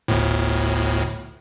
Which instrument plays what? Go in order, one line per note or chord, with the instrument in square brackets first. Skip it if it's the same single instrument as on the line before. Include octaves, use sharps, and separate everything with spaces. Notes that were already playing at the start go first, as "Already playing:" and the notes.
[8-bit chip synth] G1 D2 A2